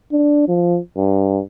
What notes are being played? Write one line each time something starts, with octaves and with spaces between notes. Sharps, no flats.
D4
F3
G2